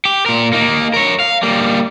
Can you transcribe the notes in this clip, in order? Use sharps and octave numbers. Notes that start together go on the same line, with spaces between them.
G4
A#2 A#4
A#3 D#4
A#4 C#5
F5
G3 A#3